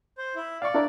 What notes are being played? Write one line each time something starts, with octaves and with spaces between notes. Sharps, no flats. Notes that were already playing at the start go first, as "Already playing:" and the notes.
C5
E4
D5 F5 C#6
D4 E4 A#4